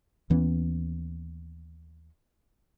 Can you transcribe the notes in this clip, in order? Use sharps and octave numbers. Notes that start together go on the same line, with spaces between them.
D#2 E3 B3 C#4